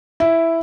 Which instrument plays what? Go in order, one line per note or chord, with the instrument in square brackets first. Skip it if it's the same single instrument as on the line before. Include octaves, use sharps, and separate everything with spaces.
[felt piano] E4